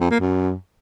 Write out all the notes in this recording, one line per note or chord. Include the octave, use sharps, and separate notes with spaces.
F2
A#3
F#2